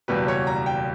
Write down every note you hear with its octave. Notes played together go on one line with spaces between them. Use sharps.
F#1 E2 B2 G3 B4
C#5
A#5
G5